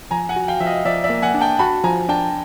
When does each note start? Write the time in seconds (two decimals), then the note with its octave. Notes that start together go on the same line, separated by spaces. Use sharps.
0.11 F3 G#5 A#5
0.29 F#5 G#5
0.36 F#4
0.48 F5 G5
0.60 F3 E5
0.66 D#5 F5
0.85 F3 D5 E5
1.04 D5 E5
1.10 A#3
1.22 F#5 G#5
1.34 D4
1.41 G5 A5
1.59 F#4 A5 B5
1.84 F3 G#5 A#5
2.09 D4 G5 A5